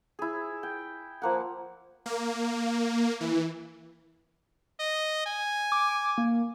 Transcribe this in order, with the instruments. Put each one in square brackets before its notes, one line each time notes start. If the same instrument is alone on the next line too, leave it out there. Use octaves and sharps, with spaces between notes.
[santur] E4 G#4
G5
F3 A#3 F#5
[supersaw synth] A#3
E3
[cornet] D#5
G#5
[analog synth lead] D6
A#3